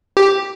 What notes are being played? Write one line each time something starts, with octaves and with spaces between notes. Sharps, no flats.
G4